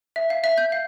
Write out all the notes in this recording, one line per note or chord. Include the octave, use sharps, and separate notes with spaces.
E5
F5
E5
G6
F5